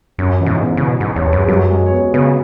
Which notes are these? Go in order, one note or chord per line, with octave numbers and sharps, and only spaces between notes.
F#2 C#4
E3 E4
B2
G#2
B3 B4
C#3
B2
G#2
E2 C#5
B4
F#2
G#4
F#2 F#3 F#4
G#3 G#4
C#5
B3 B4
C#3 B3 B4